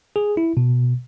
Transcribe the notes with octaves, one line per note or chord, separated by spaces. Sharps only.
G#4
E4
B2